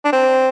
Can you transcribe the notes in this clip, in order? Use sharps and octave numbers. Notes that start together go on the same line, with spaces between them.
D4
C4